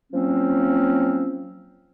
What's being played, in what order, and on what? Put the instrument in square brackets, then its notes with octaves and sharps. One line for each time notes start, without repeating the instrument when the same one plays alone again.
[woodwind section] F3 F#3 A#3 C4 C#4